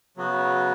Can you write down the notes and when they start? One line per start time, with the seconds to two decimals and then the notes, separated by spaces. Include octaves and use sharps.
0.17 C#3 F#3 B3 F#4